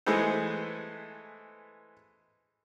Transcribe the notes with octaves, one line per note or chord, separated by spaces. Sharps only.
E3 G#3 A3 B3 A4 C5